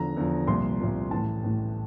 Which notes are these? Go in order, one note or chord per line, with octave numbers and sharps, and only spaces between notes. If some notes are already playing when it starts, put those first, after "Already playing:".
Already playing: E2 D3 F3 A#5
E2 D3 F3
C2 A#2 F3 C6
C2 A#2 F3
A1 A2 E3 A5
A1 A2 E3